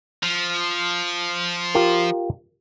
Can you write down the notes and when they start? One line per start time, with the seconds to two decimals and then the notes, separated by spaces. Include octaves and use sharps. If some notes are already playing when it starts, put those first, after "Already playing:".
0.23 F3
1.75 F4 G4 A#4